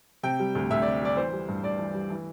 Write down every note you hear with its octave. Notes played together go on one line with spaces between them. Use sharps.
C3 G5
G3
D2
D2 E5
D5
C3
G3 D5
E3 C5
G3
G2
G2 D5
E3
G3
E3